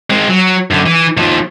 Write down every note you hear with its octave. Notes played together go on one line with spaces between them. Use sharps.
G#3 C4
F#3
F#2 D3
E3
D#2 F3